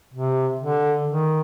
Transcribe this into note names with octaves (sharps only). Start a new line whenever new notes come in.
C3
D3
D#3